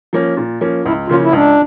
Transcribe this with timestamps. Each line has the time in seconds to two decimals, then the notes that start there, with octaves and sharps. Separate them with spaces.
0.13 F3 A#3 C#4
0.37 A#2
0.61 F3 A#3 C#4
0.86 C#2 E4
1.08 C#3 F3 A#3 C#4 F4
1.21 E4
1.33 C#2 D4